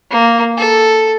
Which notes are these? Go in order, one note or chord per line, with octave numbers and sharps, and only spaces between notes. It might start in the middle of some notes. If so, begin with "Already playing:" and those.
A#3
A4